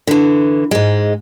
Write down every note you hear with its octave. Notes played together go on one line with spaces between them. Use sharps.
D3 E3
G#2 G#3